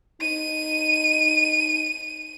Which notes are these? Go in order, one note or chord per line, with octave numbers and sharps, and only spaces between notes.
D#4 D#7